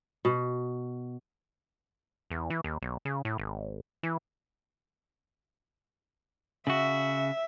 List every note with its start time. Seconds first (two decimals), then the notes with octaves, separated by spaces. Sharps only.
0.25 B2
2.30 E2
2.50 E3
2.64 D#2
2.82 B1
3.05 C#3
3.25 A2
3.38 G#1
4.03 E3
6.67 C#3 F#4 E5